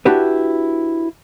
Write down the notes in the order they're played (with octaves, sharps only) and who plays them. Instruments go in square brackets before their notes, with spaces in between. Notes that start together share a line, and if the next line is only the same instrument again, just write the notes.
[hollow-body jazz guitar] D4 E4 F#4 G4 B4